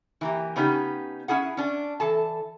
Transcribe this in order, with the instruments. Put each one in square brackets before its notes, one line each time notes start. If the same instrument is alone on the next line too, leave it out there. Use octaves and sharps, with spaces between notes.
[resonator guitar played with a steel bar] E3 A#3 G4
C#3 B3 C#4 D#4 G4
C#4 E4 G#4 F#5
C#4 D4
E3 A4 A5